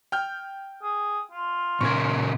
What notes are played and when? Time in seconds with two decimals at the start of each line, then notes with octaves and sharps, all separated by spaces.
0.12 G5 F6 G6
0.83 G#4
1.31 F4
1.81 A#2 C#3 A#4 C#6 G#6